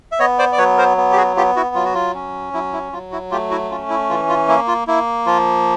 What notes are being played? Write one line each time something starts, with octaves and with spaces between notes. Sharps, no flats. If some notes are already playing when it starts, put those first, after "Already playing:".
E5
B3 C#5 D#5
C5 D5
D5
F#3 B4 C#5
A#4 C5
B3
G4
F#4 G#4
B3 F4 G4
E4 F#4
F#3 F4
F#4
F4
C#4
F#3 E4
E4
F#3 F4
E4 F#4
A3 F4 G4
E4 F#4
C#4 F4
E4
E3 F4
F4
A#3 E4
F4
A#3 E4
F3 F4